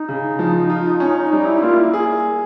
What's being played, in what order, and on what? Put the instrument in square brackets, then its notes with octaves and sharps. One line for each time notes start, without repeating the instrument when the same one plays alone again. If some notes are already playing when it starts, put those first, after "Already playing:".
Already playing: [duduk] D#4
[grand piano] C#3
F3
F4
C#4
[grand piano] G3 [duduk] D#4
[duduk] E4
[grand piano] A#3 [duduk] F4
[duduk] E4
[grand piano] G#4